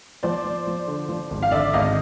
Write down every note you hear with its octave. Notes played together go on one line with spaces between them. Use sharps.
F3 C5 D5
F3
F3
D3
F3
G#1
F5
D3 D5 E5
G#1 D#5 F5